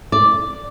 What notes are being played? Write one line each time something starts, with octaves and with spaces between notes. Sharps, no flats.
D5